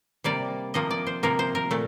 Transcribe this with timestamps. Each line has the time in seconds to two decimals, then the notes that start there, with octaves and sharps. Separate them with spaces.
0.24 C3 G3 A#3 D5
0.74 C3 F3 A#3 D#5
0.91 D5
1.07 C5
1.23 C3 F3 A#3 A#4
1.39 C5
1.55 A#4
1.71 A#2 A3